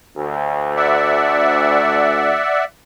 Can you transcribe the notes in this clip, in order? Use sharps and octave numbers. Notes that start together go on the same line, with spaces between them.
D2
D5 E5 F#5